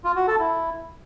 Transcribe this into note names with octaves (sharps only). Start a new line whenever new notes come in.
F4
F#4
A4
E4